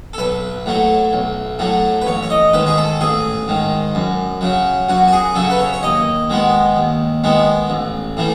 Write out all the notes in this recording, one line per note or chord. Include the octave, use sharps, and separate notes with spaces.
A4
B1 B4
A2 F#3 A3
B1
A2 F#3 A3
B4
A1 C#5
C#5
D#5
G#2 D#3 B4
G#4
A4
A1 G#4
G#2 D#3
F#2
C#3 F#3
F#2 F#4
F#4
G#4
C#3 F#3 A4
B4
C#5
C#5
D#2 D#5
D#3 G#3 B3
D#2
D#3 G#3 B3
A1
A2 E3 A3